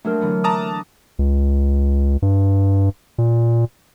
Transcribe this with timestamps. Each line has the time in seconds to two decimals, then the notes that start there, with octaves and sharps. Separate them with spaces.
0.05 F#3 A3 A#3 C4 D4 A#4
0.21 D3 E3 B3
0.44 A5 A#5 D6 D#6 F#6
1.19 C#2
2.22 G2
3.18 A#2